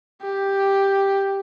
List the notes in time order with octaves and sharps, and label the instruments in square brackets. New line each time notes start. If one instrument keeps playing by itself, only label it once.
[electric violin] G4